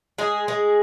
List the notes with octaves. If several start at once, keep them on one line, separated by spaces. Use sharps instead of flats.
G#3 G#4
G#3